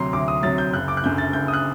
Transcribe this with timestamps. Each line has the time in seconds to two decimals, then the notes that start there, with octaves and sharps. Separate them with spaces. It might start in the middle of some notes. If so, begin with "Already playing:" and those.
Already playing: D2 C3 F#3 A#5 C6
0.13 D2 D6
0.28 D#6
0.43 C3 F#3 A6
0.58 G6
0.73 F#1 F#6
0.88 D6
0.97 F#6
1.03 F#2 D3 G6
1.18 A6
1.33 F#1 G6
1.48 D#6
1.53 F#6